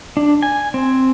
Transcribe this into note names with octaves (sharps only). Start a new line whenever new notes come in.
D4
G#5
C4